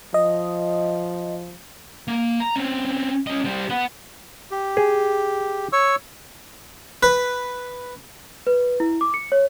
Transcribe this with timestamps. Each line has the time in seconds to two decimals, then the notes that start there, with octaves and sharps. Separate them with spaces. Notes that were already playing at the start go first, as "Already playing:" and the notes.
0.14 F3 D#5
2.08 A#3
2.40 A#5
2.56 C4 C#4
3.27 C#4 D#5
3.45 G3 C5
3.70 B3
4.51 G4
4.77 G#4
5.73 C#5 C#6 E6
7.03 B4
8.47 B4
8.80 E4
9.01 D6
9.14 C#7
9.32 C#5